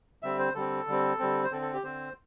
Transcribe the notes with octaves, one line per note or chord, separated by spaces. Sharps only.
D3 G3 C4 E5
C5
D3 G3 C4 A4
D3 G3 C4
D3 G3 C4
C5
D3 C4 A4
A4
G4
D3 C4 C5